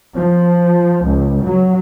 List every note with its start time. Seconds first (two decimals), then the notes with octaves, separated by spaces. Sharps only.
0.15 F3
1.04 C#2
1.43 F#3